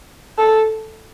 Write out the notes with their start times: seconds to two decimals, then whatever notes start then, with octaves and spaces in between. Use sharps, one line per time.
0.39 A4